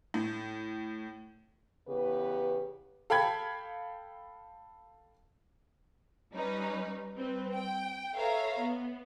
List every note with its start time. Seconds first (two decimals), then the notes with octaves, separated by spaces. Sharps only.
0.14 A2
1.87 E2 C#3 B3 G4 B4
3.10 A4 F5 G5 B5 G#6
6.33 G3 C#4 D#4 B4
7.15 G3 C4 B4
7.53 G5
8.14 A4 B4 C#5 E5 F5 A#5
8.59 B3